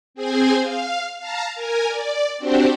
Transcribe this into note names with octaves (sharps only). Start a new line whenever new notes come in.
C4 G#4 C5 G#5
F5
F5 A5 A#5
A#4 G#5
D5
C4 D4 F#4 G4 C5